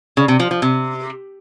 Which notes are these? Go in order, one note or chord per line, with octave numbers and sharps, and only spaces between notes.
C#3
C3
F3
F3
C3